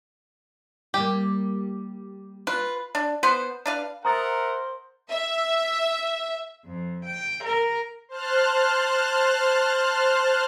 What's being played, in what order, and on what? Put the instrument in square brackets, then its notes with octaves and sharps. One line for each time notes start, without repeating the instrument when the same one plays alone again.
[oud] G3 A#3 [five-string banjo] G4
[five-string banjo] F4 [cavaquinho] B4
[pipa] D4
B3 B4 C5
D4 B4 F5
[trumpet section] A#4 E5 F#5 [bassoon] C5 [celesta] A#5 D#6 A6
[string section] E5
[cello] F2
G5
A#4
[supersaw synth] C5 A5 F6 F#6